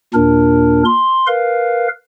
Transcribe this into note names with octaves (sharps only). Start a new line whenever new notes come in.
D#2 A#2 D4 A#4
C6
A#4 B4 F5